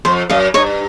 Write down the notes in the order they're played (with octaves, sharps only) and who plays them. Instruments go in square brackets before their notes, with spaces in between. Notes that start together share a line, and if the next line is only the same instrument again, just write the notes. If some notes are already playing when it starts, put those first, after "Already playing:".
[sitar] F2 [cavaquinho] C5
[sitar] F#2 [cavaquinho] D#5 F5
[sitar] G2 [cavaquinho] C#5 D#5